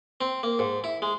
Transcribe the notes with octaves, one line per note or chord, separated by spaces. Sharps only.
C4
A#3
G#2
E4
G#3